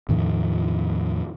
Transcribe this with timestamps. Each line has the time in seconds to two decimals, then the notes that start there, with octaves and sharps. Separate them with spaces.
0.09 E2 A2 D#3 F3